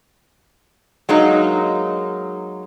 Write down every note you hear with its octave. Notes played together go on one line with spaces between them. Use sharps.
F#3 G#3 A#3 D#4